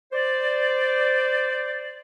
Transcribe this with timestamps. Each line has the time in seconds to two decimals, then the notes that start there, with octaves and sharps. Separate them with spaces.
0.13 C5 D5